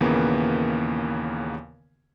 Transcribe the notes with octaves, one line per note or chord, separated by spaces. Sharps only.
D#2 A#2 C#3 E3 A#3 B3